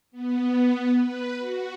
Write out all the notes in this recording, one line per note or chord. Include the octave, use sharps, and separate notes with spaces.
B3
B4
F#4